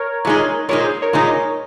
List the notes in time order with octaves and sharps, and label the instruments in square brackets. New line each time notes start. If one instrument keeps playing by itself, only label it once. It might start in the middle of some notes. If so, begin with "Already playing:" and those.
Already playing: [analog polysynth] A#4 C#5
[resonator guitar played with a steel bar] A#2 G#3 D#4
[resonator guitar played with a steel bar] A#2 G#3 D#4 [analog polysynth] A#4 C#5
[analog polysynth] G#4 C5
A#4 C#5
[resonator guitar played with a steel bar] A#2 G#3 D#4